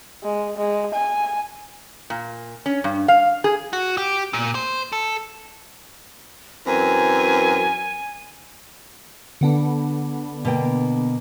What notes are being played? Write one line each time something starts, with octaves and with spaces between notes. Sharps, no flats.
G#3
G#3
G#5
A#2
C#4
G2
F5
G#4
F#4
G4
A#2
C5
A4
F#2 E3 C4 G#5
D3 B3 D4
B2 A#3 G5